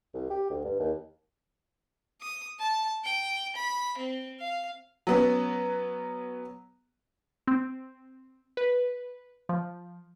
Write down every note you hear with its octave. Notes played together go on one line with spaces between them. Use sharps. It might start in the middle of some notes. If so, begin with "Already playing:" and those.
C2
G4
D2
G2
D#2
D#6
A5
G5
B5
C4
F5
F#3 B3 C#4
C4
B4
F3